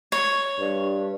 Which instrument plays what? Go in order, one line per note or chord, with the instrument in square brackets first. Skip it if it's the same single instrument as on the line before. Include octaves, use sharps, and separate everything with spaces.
[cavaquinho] C#5
[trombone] G2